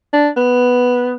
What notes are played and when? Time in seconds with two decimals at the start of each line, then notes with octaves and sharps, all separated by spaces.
0.13 D4
0.36 B3